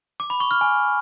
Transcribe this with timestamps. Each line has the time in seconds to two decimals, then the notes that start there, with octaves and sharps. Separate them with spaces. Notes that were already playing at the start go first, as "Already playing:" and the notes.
0.20 D6
0.30 B5
0.40 C#6
0.51 F6
0.61 G#5